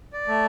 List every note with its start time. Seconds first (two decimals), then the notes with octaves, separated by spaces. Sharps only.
0.13 D5
0.28 A3